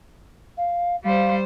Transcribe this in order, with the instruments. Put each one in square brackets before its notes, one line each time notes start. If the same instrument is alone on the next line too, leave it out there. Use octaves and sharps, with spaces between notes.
[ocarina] F5
[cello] G3 C5 [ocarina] F5